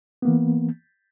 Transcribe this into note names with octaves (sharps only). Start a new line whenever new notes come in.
E3 A#3 B3